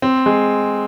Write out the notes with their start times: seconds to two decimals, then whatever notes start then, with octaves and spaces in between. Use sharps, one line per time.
0.02 C4
0.26 G#3